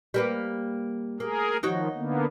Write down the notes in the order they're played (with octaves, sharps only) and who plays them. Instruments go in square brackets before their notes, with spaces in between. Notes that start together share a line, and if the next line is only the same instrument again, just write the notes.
[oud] G3 A#3 B4
[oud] A#3 [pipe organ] G#4 A#4
[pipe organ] D#3 F3 [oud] D#4 F#4 C#5
[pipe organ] D3 A#3 B3